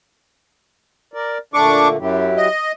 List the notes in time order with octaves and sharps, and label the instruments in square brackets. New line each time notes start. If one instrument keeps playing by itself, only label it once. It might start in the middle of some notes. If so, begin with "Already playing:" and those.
[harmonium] A#4 D5
[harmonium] A#2 D3 A3 [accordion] D4 C#6 D6
[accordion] F#2 [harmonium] F#3 E4 G4
[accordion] D#5